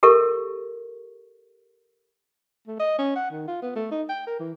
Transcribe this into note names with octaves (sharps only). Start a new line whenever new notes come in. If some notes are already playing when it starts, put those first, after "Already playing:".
G4 A4 A#4 E5 C#6
A3
D#5
C#4
F#5
D#3
F4
B3
A3
D#4
G5
A#4
E3